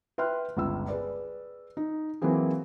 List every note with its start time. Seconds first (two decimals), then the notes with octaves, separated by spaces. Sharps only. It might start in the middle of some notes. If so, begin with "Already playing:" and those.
0.18 B4 E5 G5 C6 F6 F#6
0.57 G1 C#2 E6
0.88 G#4 B4 D5
1.77 D#4
2.22 E3 F#3 A#3 C4 G#4